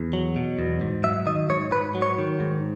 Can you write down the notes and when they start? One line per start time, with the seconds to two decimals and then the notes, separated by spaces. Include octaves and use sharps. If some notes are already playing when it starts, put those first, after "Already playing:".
Already playing: E2
0.13 F#3
0.36 B2
0.59 E2
0.81 G#2
1.04 F#3 E5
1.27 D#3 D#5
1.49 G#2 C#5
1.72 G#2 B4
1.95 F#3
2.02 C#5
2.18 D#3
2.40 G#2